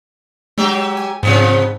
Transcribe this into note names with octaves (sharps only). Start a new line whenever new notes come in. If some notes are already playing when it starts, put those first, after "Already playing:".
F#3 G#3 G4
G#5
G#2 C3 F3 B3 C4